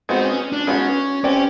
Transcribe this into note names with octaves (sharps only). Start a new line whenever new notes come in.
G#3 B3 C4 D#4 F#4
C#4
D4
G#3 B3 C#4 D#4 F#4
C4 C#4 E4 G4 B4 D5